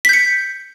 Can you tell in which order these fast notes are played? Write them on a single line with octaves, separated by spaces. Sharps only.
B6 G6 C#7